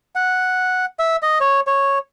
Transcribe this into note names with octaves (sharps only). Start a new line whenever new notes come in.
F#5
E5
D#5
C#5
C#5